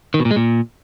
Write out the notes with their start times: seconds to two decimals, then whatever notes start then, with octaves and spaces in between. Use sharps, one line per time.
0.14 D#3
0.20 B2
0.25 A#2
0.31 G#3
0.36 A#2